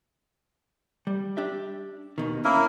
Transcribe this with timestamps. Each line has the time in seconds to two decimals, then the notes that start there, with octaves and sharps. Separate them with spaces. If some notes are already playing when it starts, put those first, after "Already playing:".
1.07 G3
1.37 D4 G4 E5
2.18 D#2 B2 D#3
2.45 A#3 C#4 E4 A#4